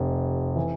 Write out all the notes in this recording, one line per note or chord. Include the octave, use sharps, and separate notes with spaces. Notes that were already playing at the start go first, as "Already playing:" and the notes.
Already playing: F1 C3
E3